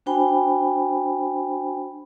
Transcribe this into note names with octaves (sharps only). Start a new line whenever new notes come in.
D4 F#4 C5 G5 G#5 B5